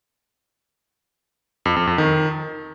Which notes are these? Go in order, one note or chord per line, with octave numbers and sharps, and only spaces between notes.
F2
F2
F2
D#3